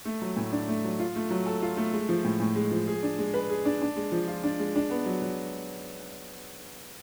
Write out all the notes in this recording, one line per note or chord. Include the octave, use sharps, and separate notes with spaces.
A3
F#3
A2
D4
A3
F#3
F4
A3
F#3
A4
F4
A3
G#3
F3
A2
A2
G#3
F3
G#4
D4
G#3
B4
G#4
D4
D4
G#3
F3
F4
D4
G#3
D4
B3
F#3
F#3